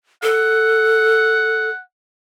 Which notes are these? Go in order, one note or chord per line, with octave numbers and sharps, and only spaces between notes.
A4 F#5